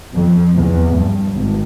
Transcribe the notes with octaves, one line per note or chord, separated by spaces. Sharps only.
F2
E2
G2
G#1